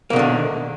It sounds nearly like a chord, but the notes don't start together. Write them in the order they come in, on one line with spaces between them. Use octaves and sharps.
A#3 B2 D3 D#3